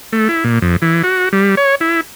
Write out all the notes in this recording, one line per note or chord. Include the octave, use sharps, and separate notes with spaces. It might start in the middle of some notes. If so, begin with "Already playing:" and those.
A3
E4
A#2
F2
E3
F#4
G3
C#5
E4